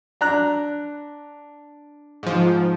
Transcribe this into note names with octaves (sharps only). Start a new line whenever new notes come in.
D4 A#5 F#6
G#2 F3